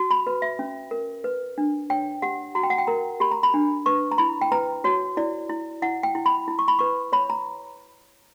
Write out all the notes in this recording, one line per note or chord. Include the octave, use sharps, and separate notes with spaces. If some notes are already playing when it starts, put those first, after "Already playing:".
Already playing: F#4
B5
B4
E5
C#4
A#4
B4
D4
C#5 G5
G4 F#5
F#4 A#5
G5
F#5
G5
A#4 A#5
G4 B5
A#5
B5
D4
B4 C#6
A#5
E4 B5
G5
B4 A#5
F#4 C#5
E4 D5
E4
E4 F#5
G5
E4
B5
E4
C#6
B5
B4 C#6
C#5 B5
A#5